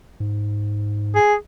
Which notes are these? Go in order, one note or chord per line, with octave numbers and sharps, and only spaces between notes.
G#2
G#4